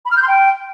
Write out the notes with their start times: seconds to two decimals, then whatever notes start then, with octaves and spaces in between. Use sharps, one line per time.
0.05 B5
0.11 F6
0.16 G6
0.22 C6
0.28 G5